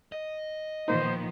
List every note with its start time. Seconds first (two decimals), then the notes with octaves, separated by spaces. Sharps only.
0.12 D#5
0.88 A#2 D#3 F3 A#3 B3 D#4 C5